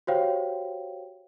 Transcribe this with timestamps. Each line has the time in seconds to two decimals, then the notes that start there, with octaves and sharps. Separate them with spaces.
0.07 F#4 G4 C5 C#5 F5 G5